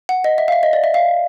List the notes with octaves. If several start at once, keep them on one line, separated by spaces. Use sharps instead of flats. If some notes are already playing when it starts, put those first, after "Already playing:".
F#5
D#5
E5
F5
E5
D#5
D5
E5
F5